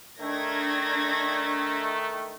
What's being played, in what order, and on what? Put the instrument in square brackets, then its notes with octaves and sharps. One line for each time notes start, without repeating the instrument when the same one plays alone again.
[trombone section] D#3 A3 [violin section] D4 G#6 A#6